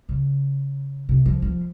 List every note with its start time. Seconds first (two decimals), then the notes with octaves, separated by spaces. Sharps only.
0.09 C#3
1.09 C3
1.25 F3
1.42 F3